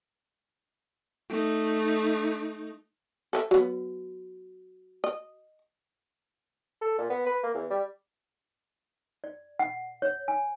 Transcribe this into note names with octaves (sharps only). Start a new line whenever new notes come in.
A3 D#4
A4 B4 E5
F#3 B3 F#4
D#5
A4
A#2
B3
B4
A#3
E2
G3
D5
F#5
C#5
G#5